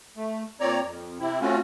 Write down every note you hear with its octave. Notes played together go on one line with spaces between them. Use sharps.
A3
A#2 C4 C#5 D5 A#5
F2
C3 C4 E4
A3 C4 C#4 F4 F#4